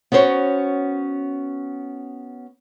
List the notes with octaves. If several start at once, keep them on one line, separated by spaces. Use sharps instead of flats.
B3 C#4 F#4 C5 C#5